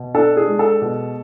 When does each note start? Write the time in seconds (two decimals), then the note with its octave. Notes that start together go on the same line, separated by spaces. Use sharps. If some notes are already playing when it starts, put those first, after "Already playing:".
Already playing: B2
0.15 D4 A4
0.37 G#4
0.48 G#3
0.59 A4
0.82 B2